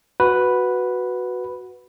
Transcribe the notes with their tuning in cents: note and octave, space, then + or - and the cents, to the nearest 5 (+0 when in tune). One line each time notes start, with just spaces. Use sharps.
F#4 -5 B4 +0